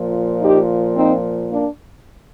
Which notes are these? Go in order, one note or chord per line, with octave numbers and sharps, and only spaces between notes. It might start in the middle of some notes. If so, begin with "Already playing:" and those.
Already playing: A#2 F3
D#4 G4
C4 D#4
A#3 D4